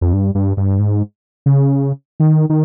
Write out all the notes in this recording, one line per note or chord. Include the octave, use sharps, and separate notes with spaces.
F2
G2
G2
G2
G#2
C#3
D#3
D#3